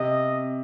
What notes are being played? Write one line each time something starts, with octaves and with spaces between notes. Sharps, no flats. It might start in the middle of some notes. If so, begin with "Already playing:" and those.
Already playing: C3 D#5